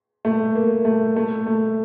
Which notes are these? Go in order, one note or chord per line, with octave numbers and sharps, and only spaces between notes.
A3
A#3
A3
A3
A3